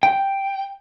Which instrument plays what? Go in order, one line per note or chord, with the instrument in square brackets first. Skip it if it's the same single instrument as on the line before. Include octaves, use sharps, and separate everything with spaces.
[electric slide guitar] G5